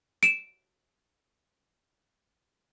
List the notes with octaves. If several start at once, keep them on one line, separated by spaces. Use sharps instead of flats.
D7 E7